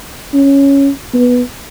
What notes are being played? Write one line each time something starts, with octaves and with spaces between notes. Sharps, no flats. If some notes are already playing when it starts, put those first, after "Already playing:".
C#4
B3